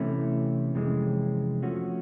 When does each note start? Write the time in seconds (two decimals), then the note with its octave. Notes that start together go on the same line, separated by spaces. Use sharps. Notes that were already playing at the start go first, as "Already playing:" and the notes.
Already playing: C3 E3 A3 C#4 E4
0.75 F2 C3 E3 G#3 C#4
1.63 F3 A3 C#4 F#4